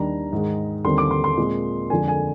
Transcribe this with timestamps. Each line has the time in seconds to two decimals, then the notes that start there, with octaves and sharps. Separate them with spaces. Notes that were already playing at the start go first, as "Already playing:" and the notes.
Already playing: D#2 D#3 G3 D4 A#5
0.33 G#2 D#3 G#3
0.85 D#2 D3 G3 C4 C6
0.98 D6
1.11 C6
1.24 C6
1.37 A#2 G#3 C4
1.90 F2 D3 G#3 D4 G#5
2.08 G#5